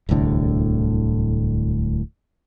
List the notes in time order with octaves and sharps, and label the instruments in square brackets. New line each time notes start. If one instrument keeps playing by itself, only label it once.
[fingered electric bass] D1 C2 A2 D3